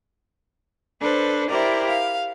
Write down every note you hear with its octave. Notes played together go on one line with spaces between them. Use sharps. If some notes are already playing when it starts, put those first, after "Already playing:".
D4 A4 B4 C5
E4 G4 A#4 C5 D5
F5